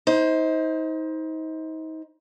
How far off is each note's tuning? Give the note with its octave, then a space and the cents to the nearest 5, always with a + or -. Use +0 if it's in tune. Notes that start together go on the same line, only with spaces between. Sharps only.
D#4 +35 C5 +0